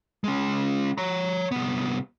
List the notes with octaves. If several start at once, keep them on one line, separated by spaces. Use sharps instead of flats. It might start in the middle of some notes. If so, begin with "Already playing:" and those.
G#3 C#4
C#5 A#5
C2 B3